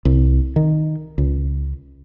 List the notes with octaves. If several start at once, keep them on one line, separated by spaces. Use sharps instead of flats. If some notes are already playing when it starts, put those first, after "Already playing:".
C2
D#3
C#2